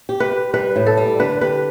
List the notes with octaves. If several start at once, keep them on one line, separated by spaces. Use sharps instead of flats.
G4
B4
G4
G3 B4
A2
A4
G3
D3 B4
G4 B4